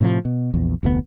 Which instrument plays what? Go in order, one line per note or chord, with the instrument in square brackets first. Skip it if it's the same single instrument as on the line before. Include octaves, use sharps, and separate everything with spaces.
[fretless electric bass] A2 C3 D#3 F3
B2
A#1 E2
F1 D2 G#2 B3